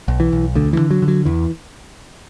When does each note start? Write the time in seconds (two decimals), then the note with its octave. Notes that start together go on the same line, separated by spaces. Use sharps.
0.08 B1
0.20 E3
0.32 B1
0.55 D2 D3
0.73 E3
0.79 D3
0.91 F#3
1.02 D3
1.08 F#3
1.25 E2 E3